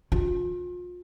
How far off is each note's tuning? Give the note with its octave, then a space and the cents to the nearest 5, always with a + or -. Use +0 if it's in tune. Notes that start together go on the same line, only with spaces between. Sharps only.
F4 +35